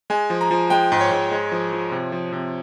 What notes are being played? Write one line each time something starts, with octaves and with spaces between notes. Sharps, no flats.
G#3 G#5
F3
A#5
F3
G#3 G5
G#2
C#5
G#2
G#3
F3
F3
C3
F3
C3